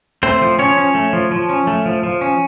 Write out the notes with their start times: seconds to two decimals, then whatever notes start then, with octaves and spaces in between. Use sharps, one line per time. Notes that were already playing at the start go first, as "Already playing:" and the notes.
0.23 A3 C4 C5
0.42 F3
0.59 F3 C#4 C#5
0.77 C#4
0.95 A3
1.13 F3
1.31 F3
1.50 C#4
1.67 A3
1.86 F3
2.03 F3
2.21 C#4